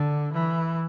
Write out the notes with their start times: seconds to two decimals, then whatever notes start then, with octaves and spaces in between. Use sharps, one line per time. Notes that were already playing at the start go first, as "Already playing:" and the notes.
Already playing: D3
0.33 E3